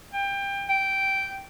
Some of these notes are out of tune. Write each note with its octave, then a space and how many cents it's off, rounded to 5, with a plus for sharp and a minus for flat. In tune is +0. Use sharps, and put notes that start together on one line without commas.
G5 +25
G5 -10